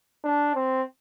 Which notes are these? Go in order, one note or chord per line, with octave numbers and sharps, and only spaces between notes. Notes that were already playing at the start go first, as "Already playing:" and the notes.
D4
C4